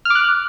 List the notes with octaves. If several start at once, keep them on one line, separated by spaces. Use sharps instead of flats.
D6 F6 F#6